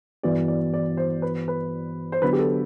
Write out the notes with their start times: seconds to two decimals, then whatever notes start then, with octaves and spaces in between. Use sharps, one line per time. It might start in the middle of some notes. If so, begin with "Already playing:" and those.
0.23 G2 E3 B3 F#4 D5
0.48 D5
0.74 D5
0.97 C5
1.22 B4
1.48 B4
2.12 C5
2.22 D3 F#3 B3 D4 F#4 B4
2.33 G4
2.39 A4